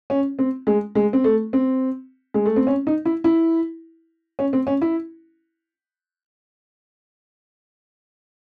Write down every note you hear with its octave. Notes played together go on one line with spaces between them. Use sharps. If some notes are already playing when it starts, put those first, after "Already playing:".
C#4
C4
G#3
G#3
C4
A3
C4
G#3
A3
C4
C#4
D#4
E4
E4
C#4
C4
C#4
E4